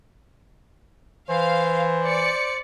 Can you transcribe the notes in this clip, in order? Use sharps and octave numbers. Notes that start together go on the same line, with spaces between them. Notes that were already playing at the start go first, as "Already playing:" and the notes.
E3 C5 F5
D5 C#7